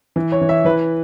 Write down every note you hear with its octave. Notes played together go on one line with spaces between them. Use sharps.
E3
C#5
E3
E5
E3 B4